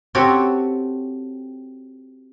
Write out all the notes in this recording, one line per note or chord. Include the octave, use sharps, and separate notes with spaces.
C4 F#4 G4 A4 C#5